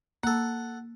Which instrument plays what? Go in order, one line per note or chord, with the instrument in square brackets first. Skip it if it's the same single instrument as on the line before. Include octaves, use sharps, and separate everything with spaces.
[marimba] A#3 [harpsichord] A4 F#5